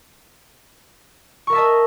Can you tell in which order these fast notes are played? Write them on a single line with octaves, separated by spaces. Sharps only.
C#6 A#4 E5 A5 D#5